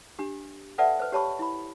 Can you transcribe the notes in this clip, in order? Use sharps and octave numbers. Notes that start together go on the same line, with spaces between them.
D4 G4
A4 B4 D5 E5 F#5 A5
B4 C5
G4 C#5 A5 B5 C#6
E4 B5